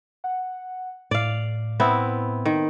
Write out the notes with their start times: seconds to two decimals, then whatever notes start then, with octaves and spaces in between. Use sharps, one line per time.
0.24 F#5
1.11 A2 D5 F5
1.80 B3 C4 E4
2.45 D#3